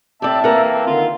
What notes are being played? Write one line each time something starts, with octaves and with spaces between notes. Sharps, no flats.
A2 C4 G4 D5 E5 A5
E3 A#3 C4 A#4 F#5
D3 D#3 F4